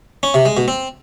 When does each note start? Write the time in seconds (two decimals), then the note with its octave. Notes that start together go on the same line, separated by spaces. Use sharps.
0.23 C#4
0.34 C3
0.45 G#3
0.57 B2
0.68 C4